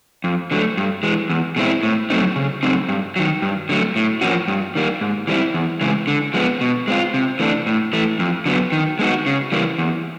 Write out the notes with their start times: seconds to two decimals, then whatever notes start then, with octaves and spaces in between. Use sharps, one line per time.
0.24 F2
0.51 D3 F#3 A3
0.77 G2
1.03 E3 G#3
1.29 E2
1.56 B2 G#3 C4 E4
1.83 A2
2.10 F#3 A3 C4 D#4
2.36 C#3
2.63 F#3 A3 C4 D#4
2.89 G2
3.16 D#3 F#3
3.42 G2
3.69 D3 F#3 A3
3.96 A2
4.21 F3 A#3 C#4 F#4
4.48 G2
4.75 D#3 G3 A#3
5.01 G#2
5.27 E3 G3 C4 E4
5.54 E2
5.81 C#3 E3 G#3
6.07 D3
6.34 F3 G#3 B3
6.61 B2
6.88 G#3 C4 F4
7.14 C3
7.39 E3 A3 D4
7.66 A2
7.93 E3 A3
8.19 F2
8.46 D3 F#3 B3
8.72 D#3
8.99 G#3 B3 D#4 F#4
9.26 C#3
9.52 E3 G3 A#3
9.78 E2